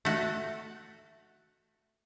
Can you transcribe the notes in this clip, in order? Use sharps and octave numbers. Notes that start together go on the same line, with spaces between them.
A3 F#4